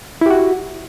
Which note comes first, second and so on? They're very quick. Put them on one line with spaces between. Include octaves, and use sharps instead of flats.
E4 G4 F#4